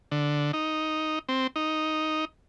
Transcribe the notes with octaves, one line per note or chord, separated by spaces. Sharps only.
D3
D#4
C4
D#4